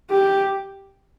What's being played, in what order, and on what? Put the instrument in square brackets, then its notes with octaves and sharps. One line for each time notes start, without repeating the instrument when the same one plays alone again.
[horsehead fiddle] G4